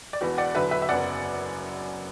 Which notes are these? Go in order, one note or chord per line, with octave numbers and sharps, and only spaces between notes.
D5
E1 E2 E3 B3 F#4 B4
D5 F#5
E1 E2 D3 F#3 B4 E5
B4 E5
E5
F#1 F#2 F#3 B3 D5 F#5